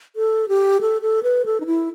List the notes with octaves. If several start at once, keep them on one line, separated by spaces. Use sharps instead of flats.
A4
G4
A4
A4
B4
A4
D#4
E4